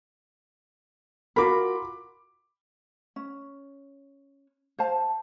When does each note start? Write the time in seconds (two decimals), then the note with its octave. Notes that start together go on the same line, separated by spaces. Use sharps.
1.36 F4 F#4 A#4 B5 D6
3.16 C#4
4.79 C5 F5 A5